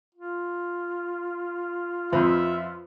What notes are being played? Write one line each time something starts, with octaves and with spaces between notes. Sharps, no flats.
F4
F2 B4 C5 E5